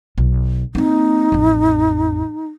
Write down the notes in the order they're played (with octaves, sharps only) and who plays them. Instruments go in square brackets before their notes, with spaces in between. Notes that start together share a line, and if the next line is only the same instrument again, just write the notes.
[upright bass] B1
[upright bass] A#3 C4 [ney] D#4
[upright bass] A1 F2